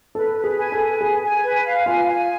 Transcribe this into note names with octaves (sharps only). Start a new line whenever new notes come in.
A4 B4
B4
G#4
G#5
A4
B4
G#4 G#5
G#5
B4
F5
F4 G#5
G#5